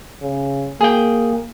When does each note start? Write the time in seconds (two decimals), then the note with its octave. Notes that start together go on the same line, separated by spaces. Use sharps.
0.22 C#3
0.81 A#3 G#4 G5